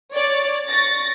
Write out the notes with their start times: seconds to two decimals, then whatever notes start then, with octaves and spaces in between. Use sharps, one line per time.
0.13 C#5 D5 A6
0.69 C#6 A6 A#6